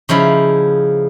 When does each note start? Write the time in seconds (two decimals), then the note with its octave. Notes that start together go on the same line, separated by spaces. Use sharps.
0.09 C#3 F3 D#4 E4